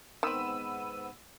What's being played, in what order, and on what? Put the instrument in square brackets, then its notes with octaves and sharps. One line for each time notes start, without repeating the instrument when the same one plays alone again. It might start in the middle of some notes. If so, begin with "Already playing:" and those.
[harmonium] G#2 B3 [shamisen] D#3 C4 [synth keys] B5 E6 D#7